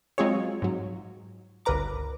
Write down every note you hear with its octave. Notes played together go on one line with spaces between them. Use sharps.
F#3 G#3 C4 F4 G#4 C#5
G#2 F#3
G1 C#2 A#4 B4 A#5 D6